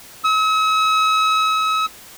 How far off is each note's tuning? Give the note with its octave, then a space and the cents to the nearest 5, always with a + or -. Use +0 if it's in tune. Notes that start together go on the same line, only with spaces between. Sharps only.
E6 -45